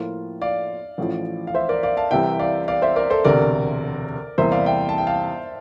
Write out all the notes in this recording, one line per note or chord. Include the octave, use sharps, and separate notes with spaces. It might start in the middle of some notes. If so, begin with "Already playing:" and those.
Already playing: A2 F3 A#3 F4
D5 F5
A1 A2 F3
F5
C5 E5
A#4 D5
D5 F5
F5 A5
C2 C3 E3 E5 G5
D5 F5
D5 F5
C5 E5
A#4 D5
A4 C5
E1 D2 C3 A#4 D5
E2 C3 G3 A#3 E4 C5 E5
D5 F5
E5 G5
A5
G5
F5 A5